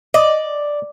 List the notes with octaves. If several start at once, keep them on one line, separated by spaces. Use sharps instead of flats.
D5 D#5